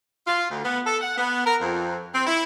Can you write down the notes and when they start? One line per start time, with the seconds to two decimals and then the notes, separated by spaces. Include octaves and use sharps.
0.26 F4
0.50 D2
0.64 B3
0.85 A4
1.01 F#5
1.17 B3
1.46 A#4
1.60 F2
2.14 C4
2.27 E4